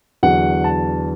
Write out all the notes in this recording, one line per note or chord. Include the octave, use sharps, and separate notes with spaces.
E2 D3 F#3 F#5
A5